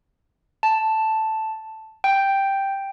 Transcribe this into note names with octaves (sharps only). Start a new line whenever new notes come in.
A5
G5